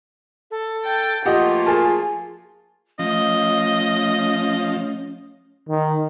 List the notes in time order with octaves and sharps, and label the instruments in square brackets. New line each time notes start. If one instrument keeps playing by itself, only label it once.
[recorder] A4
[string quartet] G5 A6
[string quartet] F3 A3 A#3 [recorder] F4 [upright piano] G4 D#5 [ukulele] F#5
[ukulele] F#4 A#4 G#5 [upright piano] G#4 A5
[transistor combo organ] F3 [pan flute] A3 [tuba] C#4 [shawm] D#5
[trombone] D#3